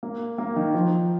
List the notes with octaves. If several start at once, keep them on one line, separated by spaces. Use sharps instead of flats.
A#3
A#3
D#3
F3